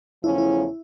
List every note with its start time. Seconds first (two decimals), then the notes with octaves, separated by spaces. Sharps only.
0.24 E2 C#3 F3 A3 C#4 E4
0.38 E4